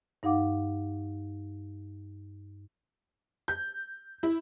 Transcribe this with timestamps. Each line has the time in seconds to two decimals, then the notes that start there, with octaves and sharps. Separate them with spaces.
0.23 G2 D#4 F5 F#5 D6
3.48 G6
4.23 E4